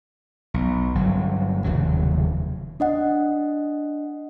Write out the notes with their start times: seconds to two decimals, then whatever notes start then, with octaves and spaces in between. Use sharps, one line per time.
0.54 B1
0.95 G1 F#3
1.64 F1 D#2 C#3 F#3
2.80 D4 D#5 F#5